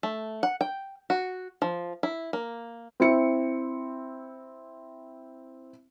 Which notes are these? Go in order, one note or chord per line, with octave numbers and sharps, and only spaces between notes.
A3
F#5
G5
F#4
F3
E4
A#3
C4 E4 C#7